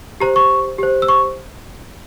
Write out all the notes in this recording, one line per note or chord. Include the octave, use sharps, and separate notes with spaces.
G4 C5 A#5
C#6
G4 C5
E6
C#6